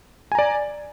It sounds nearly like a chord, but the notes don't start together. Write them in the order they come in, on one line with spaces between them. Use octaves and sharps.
G#5 A#5 D5